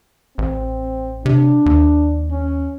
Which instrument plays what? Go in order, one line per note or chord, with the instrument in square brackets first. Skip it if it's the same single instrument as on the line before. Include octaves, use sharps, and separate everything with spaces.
[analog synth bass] A1 [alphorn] C4
[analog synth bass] C3 [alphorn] D4
[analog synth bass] D#2
[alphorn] C#4